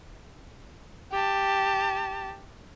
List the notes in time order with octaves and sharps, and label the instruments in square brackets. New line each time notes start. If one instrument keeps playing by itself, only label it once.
[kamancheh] G4 A5